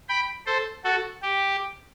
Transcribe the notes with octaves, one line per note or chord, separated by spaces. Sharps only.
G5 B5
A4 C5
F#4 A4
G4